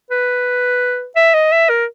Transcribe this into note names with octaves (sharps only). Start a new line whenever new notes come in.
B4
E5
D#5
E5
A#4